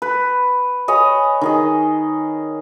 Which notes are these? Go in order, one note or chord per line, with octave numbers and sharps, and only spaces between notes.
B4
C#5 D#5 G#5 B5
D#3 G#4 D#5